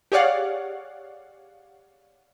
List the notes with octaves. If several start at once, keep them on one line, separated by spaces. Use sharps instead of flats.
G4 G#4 C#5 D5 F5 F#5